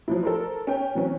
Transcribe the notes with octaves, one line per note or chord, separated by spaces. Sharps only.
F3 F#3 E4
A4 A#4 C5
C#4 G5
E3 F#3 C4 C#4